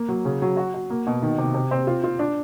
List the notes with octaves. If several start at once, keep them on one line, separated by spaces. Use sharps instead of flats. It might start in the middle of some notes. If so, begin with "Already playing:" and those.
Already playing: A#3
F#3
C#3
F#3
F#4
F#4
A#3
B2
D#3
C3
C3
C4
F4
F4
D4